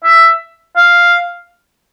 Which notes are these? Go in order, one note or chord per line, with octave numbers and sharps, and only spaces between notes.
E5
F5